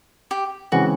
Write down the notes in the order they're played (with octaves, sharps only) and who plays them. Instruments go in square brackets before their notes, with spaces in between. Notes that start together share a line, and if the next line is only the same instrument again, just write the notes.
[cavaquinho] G4
[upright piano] C#3 E3 G#3 C4 [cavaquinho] F#4